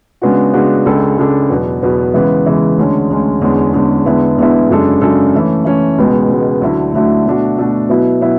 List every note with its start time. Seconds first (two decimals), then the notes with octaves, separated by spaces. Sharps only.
0.22 C#3 G#3 B3 D4 F#4
0.53 C#3 G#3 B3 D4 F#4
0.85 C#2 C#3 G#3 D4 A4
1.19 C#2 C#3 G#3 D4 A4
1.50 E2 B2 F#3 B3
1.83 E2 B2 F#3 B3
2.14 C#3 E3 G#3 B3
2.46 C#3 E3 G#3 B3
2.77 D2 D3 G#3 C#4
3.10 D2 D3 G#3 C#4
3.41 E2 D3 G#3 C#4
3.73 E2 D3 G#3 C#4
4.06 E2 D3 G#3 B3 E4
4.38 E2 D3 G#3 B3 E4
4.69 F#2 C#3 G#3 D4 A4
5.01 F#2 C#3 G#3 D4 A4
5.34 E3 A3 C#4
5.65 E3 A3 C#4
5.98 C#2 B2 G#3 B3
6.29 C#2 B2 G#3 B3
6.61 D2 D3 F#3 A3 E4
6.93 D2 D3 F#3 A3 E4
7.26 B2 A3 D4 F#4
7.58 B2 A3 D4 F#4
7.89 B2 F#3 B3 E4
8.21 B2 F#3 B3 E4